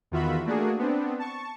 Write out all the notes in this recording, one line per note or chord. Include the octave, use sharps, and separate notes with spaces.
E2 D#3 F4 F#4 E5 B5
A3 A#3 D4 F#4 G#4
B3 C4 D4
A5 C#6